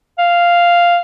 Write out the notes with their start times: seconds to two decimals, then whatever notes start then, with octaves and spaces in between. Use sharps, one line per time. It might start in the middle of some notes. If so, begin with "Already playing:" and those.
0.18 F5